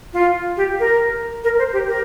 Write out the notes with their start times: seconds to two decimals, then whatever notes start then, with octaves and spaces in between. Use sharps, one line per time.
0.13 F4
0.57 G4
0.80 A#4
1.44 A#4
1.58 C5
1.73 G4
1.88 A#4